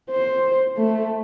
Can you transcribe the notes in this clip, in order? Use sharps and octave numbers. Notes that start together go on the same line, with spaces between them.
C5
A3